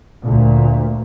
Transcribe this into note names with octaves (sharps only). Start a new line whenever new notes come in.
D2 A#2